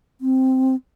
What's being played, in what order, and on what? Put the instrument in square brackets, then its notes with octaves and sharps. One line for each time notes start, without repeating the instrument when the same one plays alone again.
[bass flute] C4